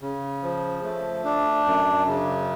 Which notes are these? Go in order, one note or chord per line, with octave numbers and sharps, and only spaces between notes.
C#3
F3
A3
D4
F#2
C#3